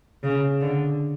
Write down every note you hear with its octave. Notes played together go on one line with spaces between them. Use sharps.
C#3
D3